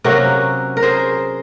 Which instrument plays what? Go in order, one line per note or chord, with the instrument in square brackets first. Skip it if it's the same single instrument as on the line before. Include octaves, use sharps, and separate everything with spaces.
[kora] C3 F#3 A#3 C#4 F#4 A#4
A#4
G#4 C5